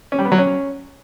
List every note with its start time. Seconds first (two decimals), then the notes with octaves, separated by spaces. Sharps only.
0.12 C#4
0.19 G3
0.25 B3
0.32 F#3
0.38 C#4